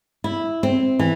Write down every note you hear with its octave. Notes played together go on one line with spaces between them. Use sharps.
E4
C4
E3